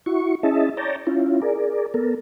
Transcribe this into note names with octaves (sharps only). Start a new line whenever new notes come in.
E4 F#4 C#6
C#4 E4 G#4 D#5 E5 A5
C#5 D5 G5 A5 A#5
C#4 E4 F4
G#4 A#4 D5
B3 A4 A#4